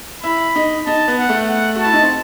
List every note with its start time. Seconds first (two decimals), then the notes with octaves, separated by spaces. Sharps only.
0.23 E4 B5
0.56 D#4
0.87 D#4 A5
1.08 B3
1.18 F#5
1.29 A3
1.49 F#5
1.76 F#4
1.81 E4 A5
1.93 D#4
2.03 C4